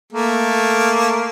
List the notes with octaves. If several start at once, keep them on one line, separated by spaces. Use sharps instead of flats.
A3 A#3